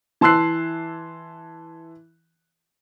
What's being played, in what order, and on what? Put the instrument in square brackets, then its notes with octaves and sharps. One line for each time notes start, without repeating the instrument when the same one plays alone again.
[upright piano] E3 A5 C6 E6 F#6 C7